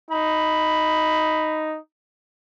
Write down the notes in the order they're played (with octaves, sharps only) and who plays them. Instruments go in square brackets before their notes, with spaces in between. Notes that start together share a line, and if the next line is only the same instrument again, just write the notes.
[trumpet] D#4 [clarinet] B5